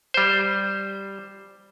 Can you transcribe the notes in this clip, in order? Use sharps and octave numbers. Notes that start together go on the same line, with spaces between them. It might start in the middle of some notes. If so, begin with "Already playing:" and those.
G3 C5